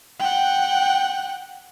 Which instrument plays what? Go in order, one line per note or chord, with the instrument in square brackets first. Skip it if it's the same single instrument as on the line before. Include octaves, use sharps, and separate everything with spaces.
[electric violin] F#5 G5